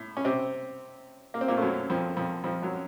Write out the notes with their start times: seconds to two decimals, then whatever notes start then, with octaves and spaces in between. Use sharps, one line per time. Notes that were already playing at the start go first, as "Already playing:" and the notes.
Already playing: A2
0.17 C#4
0.25 C3 C4
1.34 A#3
1.41 C4
1.48 A#2 A#3
1.57 A3
1.62 F#2 F#3
1.90 F2 F3
2.17 F2 F3
2.44 F2 F3
2.62 F#2 F#3